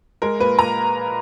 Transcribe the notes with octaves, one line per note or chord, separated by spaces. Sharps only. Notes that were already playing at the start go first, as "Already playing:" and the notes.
G#3 A#4
A#2 B4
A#2 A#5